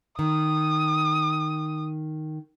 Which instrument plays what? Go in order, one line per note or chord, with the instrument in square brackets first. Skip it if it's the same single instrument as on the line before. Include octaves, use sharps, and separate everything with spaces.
[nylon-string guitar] D#3 [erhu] D#6